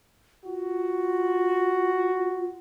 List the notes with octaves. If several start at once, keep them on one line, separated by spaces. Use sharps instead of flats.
F4 F#4